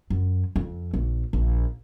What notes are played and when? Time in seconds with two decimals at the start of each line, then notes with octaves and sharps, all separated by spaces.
0.10 F#2
0.56 F2
0.94 A#1
1.33 A#1